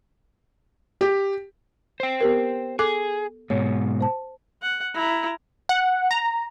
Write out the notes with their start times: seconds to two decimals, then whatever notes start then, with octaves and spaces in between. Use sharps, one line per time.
1.01 G4
2.00 C5 G5
2.21 B3 G4 A#4
2.79 G#4 A4 D6 F#6
3.50 G#2 B2 C#5
4.01 C5 A5
4.62 F#5
4.94 E4 A#5
5.69 F#5
6.11 A#5